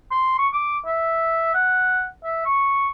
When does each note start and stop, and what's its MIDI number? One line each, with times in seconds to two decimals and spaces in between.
0.11 0.36 84
0.38 0.48 85
0.53 0.78 86
0.86 1.49 76
1.55 2.06 78
2.24 2.41 76
2.46 2.88 85